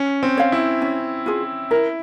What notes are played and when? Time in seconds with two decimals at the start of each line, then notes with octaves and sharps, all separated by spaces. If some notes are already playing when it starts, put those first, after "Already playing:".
Already playing: C#4
0.23 C4
0.37 C#5 F5
0.52 E4
0.82 C#4
1.26 F4 G#4
1.71 E4 A#4